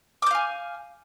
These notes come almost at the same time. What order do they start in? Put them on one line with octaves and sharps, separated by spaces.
D6 G6 F5 G#5